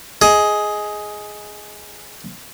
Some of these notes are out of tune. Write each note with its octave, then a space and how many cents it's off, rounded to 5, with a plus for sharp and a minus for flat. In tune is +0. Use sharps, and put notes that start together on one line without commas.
G#4 +10 D#5 +10